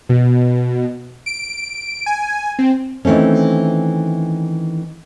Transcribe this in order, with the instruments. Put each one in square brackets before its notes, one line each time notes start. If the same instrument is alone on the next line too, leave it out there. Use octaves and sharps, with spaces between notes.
[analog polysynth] B2
D7
G#5
C4
[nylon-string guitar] D#3 E3 A3 C4 C#4